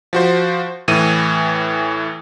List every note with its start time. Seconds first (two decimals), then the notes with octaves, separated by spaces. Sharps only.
0.13 F3 F#4 C5
0.88 A2 E3 D#7